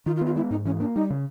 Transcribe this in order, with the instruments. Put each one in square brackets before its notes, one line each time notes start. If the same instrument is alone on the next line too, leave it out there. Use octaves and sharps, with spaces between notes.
[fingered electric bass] D#3 [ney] F4
[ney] F4
[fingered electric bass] B3
[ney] F4
[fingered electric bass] G#3 [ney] E4
[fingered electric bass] G#2 [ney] D#4
[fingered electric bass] E3 [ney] C#4
[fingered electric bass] A#3 [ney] D4
[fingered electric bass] G3 [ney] D#4
[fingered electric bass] C#3